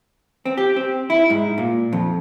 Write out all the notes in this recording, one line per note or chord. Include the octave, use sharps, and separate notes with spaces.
C4
G4
C4
E4
G#2
A#2
F2